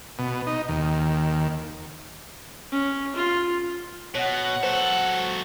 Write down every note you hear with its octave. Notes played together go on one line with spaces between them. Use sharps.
B2
D#4
D#2
C#4
F4
B2 C#5 F#5
F#3 A4 C5